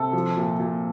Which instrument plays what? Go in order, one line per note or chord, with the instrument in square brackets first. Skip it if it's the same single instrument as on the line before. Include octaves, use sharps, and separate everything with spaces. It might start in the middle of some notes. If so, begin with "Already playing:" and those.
Already playing: [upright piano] C3 A4
F3
A#2
A#2